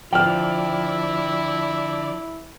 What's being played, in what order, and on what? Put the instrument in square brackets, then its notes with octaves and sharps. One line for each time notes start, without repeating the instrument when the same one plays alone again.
[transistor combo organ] D3 D5 [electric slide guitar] F3 [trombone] E4 [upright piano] G5 F6